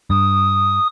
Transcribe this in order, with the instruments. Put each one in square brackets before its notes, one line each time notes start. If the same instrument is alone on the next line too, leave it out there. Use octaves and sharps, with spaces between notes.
[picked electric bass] G2 [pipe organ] D#6